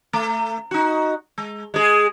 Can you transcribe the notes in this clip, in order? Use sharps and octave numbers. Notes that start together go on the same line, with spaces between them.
A3
D#4 F#4
G#3
G#3 G#4